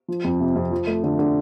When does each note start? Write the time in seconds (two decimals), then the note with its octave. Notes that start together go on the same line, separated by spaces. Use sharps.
0.08 F3
0.24 F2
0.40 C3
0.55 F2
0.71 F3
0.87 A3
1.04 D3
1.19 D3